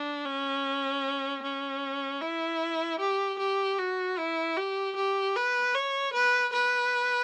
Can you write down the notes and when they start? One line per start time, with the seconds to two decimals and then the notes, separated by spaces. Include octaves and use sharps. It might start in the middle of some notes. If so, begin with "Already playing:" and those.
Already playing: D4
0.26 C#4
1.43 C#4
2.22 E4
3.00 G4
3.39 G4
3.78 F#4
4.18 E4
4.57 G4
4.96 G4
5.36 B4
5.74 C#5
6.14 B4
6.53 B4